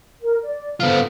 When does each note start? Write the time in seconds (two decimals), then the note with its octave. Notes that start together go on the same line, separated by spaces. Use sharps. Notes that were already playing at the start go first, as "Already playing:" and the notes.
0.20 A#4
0.43 D5
0.80 B3 F4 A4 C5